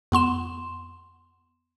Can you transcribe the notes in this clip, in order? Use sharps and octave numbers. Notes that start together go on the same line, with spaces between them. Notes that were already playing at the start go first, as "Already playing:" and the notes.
F2 B3 C6 E7